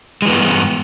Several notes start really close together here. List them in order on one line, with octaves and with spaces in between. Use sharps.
G#3 E3 B3 G2